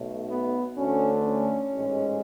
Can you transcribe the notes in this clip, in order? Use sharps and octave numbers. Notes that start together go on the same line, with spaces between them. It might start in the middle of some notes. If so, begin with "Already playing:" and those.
Already playing: B1 B2 A3
B3
D2 D3 A3 C#4
C#4
A1 G#2 G#3